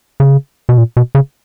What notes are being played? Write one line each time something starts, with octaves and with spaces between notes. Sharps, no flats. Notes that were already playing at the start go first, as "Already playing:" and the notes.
C#3
B2
A#2
B2
C#3